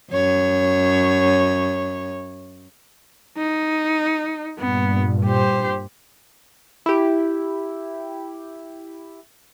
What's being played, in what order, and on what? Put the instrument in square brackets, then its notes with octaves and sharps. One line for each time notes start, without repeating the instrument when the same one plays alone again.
[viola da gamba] F#2 C#5
[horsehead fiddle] D#4
[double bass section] G2 A#2 [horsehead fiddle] B3
[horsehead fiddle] G4 C5
[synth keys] E4 G4